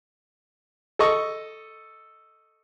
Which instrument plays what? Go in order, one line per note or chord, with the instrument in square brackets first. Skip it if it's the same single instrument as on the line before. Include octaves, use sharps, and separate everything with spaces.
[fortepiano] A4 D#5 C#6